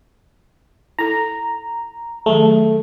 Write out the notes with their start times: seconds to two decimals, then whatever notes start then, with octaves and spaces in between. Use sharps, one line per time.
0.99 E4 A4 A#5
2.26 D#3 F#3 A3 G#4